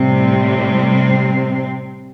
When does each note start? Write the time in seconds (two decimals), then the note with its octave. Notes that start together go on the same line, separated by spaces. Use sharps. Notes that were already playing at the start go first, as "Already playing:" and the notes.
Already playing: A2 C3 G3 C4